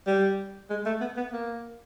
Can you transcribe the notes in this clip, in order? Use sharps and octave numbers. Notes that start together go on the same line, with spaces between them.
G3
G#3
A3
B3
B3
A#3